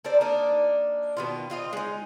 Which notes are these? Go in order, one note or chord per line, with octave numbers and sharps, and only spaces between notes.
A4 A#4 C5 D5
A#3 D4 D#4
B2 D#3 F4
C4 F4 D#5
G#3 D#4